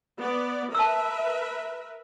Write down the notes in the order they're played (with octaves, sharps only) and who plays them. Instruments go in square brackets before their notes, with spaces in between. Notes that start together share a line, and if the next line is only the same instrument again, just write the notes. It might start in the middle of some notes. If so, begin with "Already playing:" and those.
[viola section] B3 D5
[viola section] A#4 B4 E5 [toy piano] A5 E6